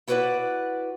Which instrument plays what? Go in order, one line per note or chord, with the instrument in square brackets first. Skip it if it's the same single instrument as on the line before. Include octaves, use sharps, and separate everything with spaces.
[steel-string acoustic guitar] E4 F#4 B4 C5 D5 F#5